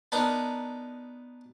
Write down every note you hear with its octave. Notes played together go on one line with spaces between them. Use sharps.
B3 D4 D#4 A#4 A#5